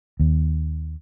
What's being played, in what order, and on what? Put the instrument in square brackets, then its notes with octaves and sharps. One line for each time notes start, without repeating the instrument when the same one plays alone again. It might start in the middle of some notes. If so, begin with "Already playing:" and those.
[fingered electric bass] D#2